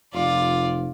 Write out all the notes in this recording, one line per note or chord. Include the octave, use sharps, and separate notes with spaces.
F1 F4 D5